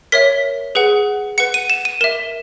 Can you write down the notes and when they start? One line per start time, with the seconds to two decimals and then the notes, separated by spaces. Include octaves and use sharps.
0.12 A#4 C#5 E5 B6
0.75 G#4 B4 F#5
1.38 B4 F#5 C#7
1.54 D#7
1.70 E7
1.85 D#7
2.01 A#4 E5 E7